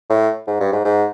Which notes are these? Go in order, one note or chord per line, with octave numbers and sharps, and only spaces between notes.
A2
G#2
G2
G#2
G#2